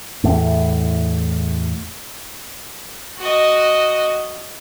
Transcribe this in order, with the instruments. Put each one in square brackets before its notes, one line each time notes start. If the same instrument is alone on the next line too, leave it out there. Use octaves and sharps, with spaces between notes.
[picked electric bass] E2 A2
[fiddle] F#4 D#5